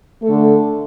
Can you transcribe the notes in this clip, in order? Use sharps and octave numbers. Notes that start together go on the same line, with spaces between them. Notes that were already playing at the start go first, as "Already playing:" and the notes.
D3 A3 A4